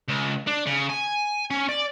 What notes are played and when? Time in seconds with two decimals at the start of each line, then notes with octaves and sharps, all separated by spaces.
0.09 C#2
0.47 D4
0.67 C#3
0.90 G#5
1.51 C#4
1.69 D5